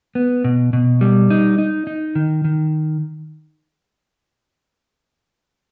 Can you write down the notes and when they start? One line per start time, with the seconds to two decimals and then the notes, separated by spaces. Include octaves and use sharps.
0.15 B3
0.44 B2
0.73 B2
1.01 G3
1.30 D#4
1.58 D#4
1.87 D#4
2.15 D#3
2.45 D#3